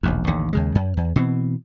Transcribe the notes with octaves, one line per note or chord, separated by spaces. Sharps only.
E1 A#1 D#2
A1 D#2 D3
D#2 C#3 G#3
F#2
E2
B2 E3 C4